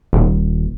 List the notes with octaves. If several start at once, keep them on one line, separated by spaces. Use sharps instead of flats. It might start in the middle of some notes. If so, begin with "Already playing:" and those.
D#1